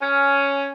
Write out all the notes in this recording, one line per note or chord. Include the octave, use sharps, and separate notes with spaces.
C#4